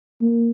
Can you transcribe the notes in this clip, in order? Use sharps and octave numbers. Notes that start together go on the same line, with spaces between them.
A#3